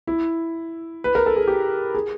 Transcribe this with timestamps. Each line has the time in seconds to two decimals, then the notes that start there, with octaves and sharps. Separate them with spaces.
0.07 E4
1.04 B4
1.15 A#4
1.26 A4
1.36 G#4
1.48 G4
1.94 G#4